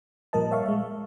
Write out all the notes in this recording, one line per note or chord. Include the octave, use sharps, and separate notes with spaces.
A#2 F3 G3 A#4 D#5 A5
C#5 E5 F5 C#6
G#3 E5